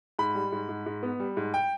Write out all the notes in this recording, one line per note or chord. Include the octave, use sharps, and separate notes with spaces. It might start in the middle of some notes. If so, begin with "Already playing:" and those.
G#2 B5
G3
G#2
G#2
G#2
B3
G3
G#2
G5